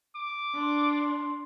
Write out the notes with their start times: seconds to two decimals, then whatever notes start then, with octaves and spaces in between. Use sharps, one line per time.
0.16 D6
0.55 D4 C6